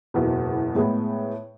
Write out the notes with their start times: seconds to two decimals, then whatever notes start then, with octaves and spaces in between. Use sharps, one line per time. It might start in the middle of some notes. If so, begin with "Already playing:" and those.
0.14 F#1 E2 B2
0.75 A2 G#3 B3